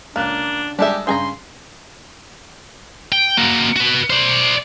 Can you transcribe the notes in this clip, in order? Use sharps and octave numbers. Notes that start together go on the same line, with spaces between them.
C#2 A#3 D4 F#6
G3 G#3 D4 G4 A4 E5
G2 C#3 G#4 G5 G#5 A#5 C6
G5
A#3 F#4
F#4 B4
C5 D5